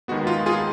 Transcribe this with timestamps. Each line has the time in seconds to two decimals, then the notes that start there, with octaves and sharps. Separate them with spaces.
0.08 D#2 D#3 G#3 B3 F#4
0.27 F4
0.46 F4 G#4